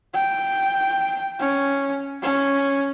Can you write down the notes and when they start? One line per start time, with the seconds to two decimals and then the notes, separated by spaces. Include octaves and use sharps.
0.15 G5
1.39 C#4
2.22 C#4